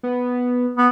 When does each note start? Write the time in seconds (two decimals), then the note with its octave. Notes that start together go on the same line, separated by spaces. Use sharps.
0.03 B3
0.78 B3